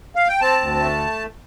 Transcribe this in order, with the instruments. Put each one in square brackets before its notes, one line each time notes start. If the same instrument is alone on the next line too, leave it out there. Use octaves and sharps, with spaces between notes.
[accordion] F5
G5
C4 A5
D2
A3